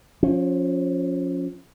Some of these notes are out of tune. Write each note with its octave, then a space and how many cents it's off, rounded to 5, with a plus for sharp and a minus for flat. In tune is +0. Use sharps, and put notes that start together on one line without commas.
F3 +25 C#4 +0